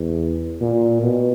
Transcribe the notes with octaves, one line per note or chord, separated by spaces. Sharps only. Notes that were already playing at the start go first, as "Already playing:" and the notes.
Already playing: E2
A#2
B2